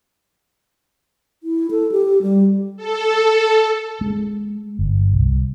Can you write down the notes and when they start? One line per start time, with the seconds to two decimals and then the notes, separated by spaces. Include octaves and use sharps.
1.43 E4
1.71 A4
1.92 G4
2.22 G3
2.77 A4
4.01 G#3
4.79 G1
5.13 C2